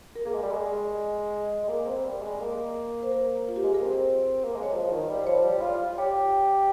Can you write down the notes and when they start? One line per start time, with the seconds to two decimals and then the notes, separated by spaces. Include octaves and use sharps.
0.16 A#4
0.26 A#3 G#4
0.34 G#3
0.43 G3
0.52 G#3
1.64 G#3
1.69 A#3
1.87 C4
2.05 G3
2.22 G#3
2.41 A#3
3.03 C5
3.12 A#4
3.48 F4
3.56 G4
3.64 G#3 G#4
3.74 A#3 A#4
3.83 C4 C5
4.44 A#3
4.55 G#3 D#5
4.63 C#5
4.71 F3 D#5
4.84 F3
4.91 D#3
5.08 G3
5.21 C5
5.26 F3 C#5
5.44 G3
5.62 F4
5.98 G4 C#5